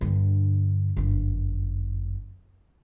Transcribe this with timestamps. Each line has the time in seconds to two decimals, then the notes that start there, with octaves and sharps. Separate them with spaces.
0.01 G2 D3
0.97 G1 F#2